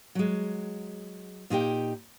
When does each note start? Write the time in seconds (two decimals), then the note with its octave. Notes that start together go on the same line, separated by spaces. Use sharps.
0.15 F#3 G#3
1.50 A#2 D#4 G4 G5